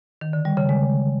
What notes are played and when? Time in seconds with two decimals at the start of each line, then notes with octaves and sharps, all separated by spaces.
0.21 D#3
0.33 D3
0.45 G3
0.57 C#3
0.69 G#3